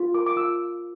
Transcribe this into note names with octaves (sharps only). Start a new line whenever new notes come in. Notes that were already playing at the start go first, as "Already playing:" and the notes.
Already playing: F4
A#4 D6
D6
F4 E6